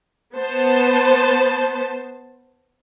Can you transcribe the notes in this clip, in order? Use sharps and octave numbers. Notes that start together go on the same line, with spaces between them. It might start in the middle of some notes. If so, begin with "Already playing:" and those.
B3 C5 A5